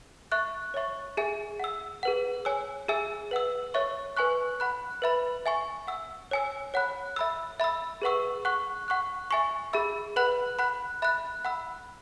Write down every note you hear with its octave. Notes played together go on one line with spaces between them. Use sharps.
E5 C#6 F#6
C#5 E5 C#6
G#4 E5 G#5
F#5 E6
G#4 B4 F#5
C#5 G#5 E6
G#4 E5 G#5 E6
B4 F#5 E6
C#5 E5 C#6
B4 G#5 C#6 F#6
F#5 B5 F#6
B4 E5 B5
E5 G#5 C#6
F#5 E6
C#5 G#5 E6
C#5 F#5 B5 F#6
E5 B5 E6
E5 B5 E6
G#4 B4 F#5 C#6 E6
F#5 C#6 F#6
F#5 C#6 F#6
E5 G#5 C#6
G#4 E5 B5 E6
B4 F#5 B5 F#6
F#5 B5 F#6
E5 B5 F#6
F#5 B5 E6